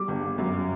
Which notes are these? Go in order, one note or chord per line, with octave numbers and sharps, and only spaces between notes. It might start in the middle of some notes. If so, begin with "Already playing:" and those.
Already playing: G3 D6
G1
G1
F#2